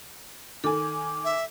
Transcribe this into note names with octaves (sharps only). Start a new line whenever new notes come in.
D#3 A4 G#5 D6
E5